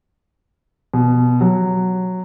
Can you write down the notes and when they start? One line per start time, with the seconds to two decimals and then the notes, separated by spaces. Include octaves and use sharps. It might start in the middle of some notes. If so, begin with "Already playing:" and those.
0.94 B2
1.41 F#3